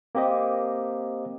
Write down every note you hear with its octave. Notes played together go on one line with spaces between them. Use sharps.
A#3 C4 G4 C5 D#5